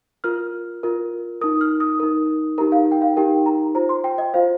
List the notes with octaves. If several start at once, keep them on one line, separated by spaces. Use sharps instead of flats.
F4 A#4 F6
F4 A#4
D#4 A#4 D#6
F6
D#6
D#4 A#4
D#4 G4 A#4 A#5
F5
G5
F5
D#4 G4 A#4 G5
A#5
F4 C5 A#5
C6
G5
D#5
F4 C5 F5